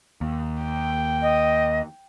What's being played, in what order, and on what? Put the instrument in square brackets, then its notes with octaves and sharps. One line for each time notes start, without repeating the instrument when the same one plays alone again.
[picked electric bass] D#2
[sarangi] G5
[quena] D#5